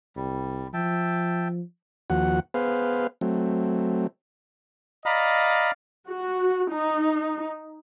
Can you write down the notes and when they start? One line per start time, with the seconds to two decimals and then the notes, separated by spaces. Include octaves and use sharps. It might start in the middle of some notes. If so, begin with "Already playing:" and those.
0.16 C2 G3
0.74 F3 E5 G5 A5
2.10 D#2 F3 F#4 F#5
2.54 B3 G#4 B4 C5 F5
3.21 F#3 A3 C4
5.06 D5 D#5 F5 A#5 B5
6.07 F#4
6.71 D#4